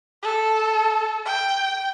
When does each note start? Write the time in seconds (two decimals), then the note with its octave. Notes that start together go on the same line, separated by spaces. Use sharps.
0.23 A4
1.26 G5